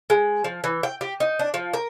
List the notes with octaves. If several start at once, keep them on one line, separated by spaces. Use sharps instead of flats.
G#3
F3
E3
G5
G4
D#4
D4
F3
A#4